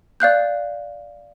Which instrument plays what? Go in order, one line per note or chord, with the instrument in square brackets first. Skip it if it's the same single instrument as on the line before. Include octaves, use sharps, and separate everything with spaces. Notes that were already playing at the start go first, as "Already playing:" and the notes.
[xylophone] D5 F5 F#6 G6